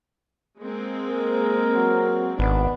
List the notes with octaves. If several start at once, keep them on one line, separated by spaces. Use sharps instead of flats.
G#3 A#3 C4
G#4 A#4
F#3
G#1 B3 D4